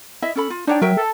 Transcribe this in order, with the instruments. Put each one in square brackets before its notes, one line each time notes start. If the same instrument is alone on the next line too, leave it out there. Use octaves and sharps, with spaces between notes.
[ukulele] E4 D#5 E5
C#4 A4 B5
F4
[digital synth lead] D4 [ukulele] D#4 C#5 G5
[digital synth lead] F#3 [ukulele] A#4 E5 G5
[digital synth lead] A4